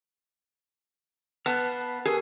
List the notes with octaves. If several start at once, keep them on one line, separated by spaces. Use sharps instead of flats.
B3 F5 A5 F6
G4 G#4 A#4